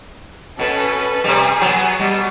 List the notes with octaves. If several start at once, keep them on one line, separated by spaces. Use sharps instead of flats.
B2 C#4 A4 B4
C3 G3 G#4
F#3 B3
B2 G3